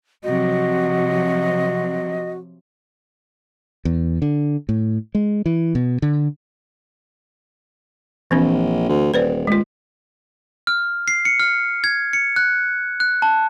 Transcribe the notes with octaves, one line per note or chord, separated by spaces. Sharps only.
C3 F3 F#3 F#4 D#5
E2
D3
A2
G#3
E3
B2
D3
A#1 E3 C4 D4
D2
D#1 B4 C5 D5
G#3 F4
F6
C7
C#7
F6
G#6
C#7
F#6
F#6
A5